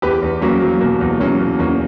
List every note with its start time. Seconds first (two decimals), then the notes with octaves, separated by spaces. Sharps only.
0.02 E2 G4 B4
0.22 E2
0.42 F#3 A#3 C#4
0.61 F#3
0.81 B2 A#3
1.01 E2
1.20 F#3 A#3 C#4
1.39 B2
1.59 E2 A#3 C#4